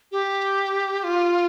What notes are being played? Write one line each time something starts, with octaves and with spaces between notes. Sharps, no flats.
G4
F4